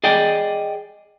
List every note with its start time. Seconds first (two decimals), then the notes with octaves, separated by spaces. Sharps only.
0.04 G#4 D5 D#5 G5